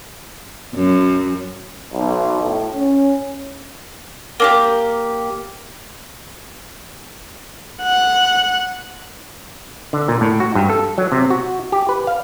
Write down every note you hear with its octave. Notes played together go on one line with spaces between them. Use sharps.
F#2
B1
A2
C#4
A#3 D4 G4
F#5
D3
A#2
A2
F#4
G2
A4
F#3
C3
F#4
G4
B4
F5